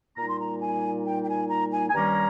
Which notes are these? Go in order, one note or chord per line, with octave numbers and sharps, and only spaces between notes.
A#2 G3 A#3 D#4 A#5
C6
A#5
G#5
G5
G5
G#5
A#5
G#5
G#5
G2 D#3 G3 A#3 C#4 A#5